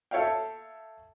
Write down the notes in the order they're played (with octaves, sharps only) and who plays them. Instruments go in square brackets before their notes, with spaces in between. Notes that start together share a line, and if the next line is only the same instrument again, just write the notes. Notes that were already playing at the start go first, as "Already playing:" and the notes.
[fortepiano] A4 C#5 E5 F5 G5